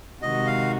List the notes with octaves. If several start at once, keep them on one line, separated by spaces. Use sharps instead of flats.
C3 D#3 G#3 D#4 F#4 D#5
F5